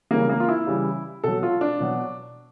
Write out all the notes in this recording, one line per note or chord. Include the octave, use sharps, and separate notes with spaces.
C#3 E3 G3 A#3
A#3
F4
E4
C#3 E3 G3
B2 F#3 A4
F4
D4
B2 F#3